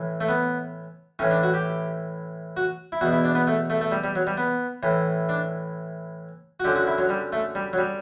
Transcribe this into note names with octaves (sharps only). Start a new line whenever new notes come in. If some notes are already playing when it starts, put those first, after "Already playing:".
Already playing: A2 E3
A3
B3
A2 E3 C#4
D4
F#4
G4
F#4
E4
E2 B2 F#4
E4
D4
B3
A3
A3
A3
G3
G3
F#3
G3
B3
A2 E3
D4
F#4
F#2 D3 G4
F#4
E4
F#3
G3
A3
G3
F#3
G3